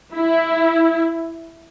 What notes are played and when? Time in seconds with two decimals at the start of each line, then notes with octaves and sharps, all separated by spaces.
0.14 E4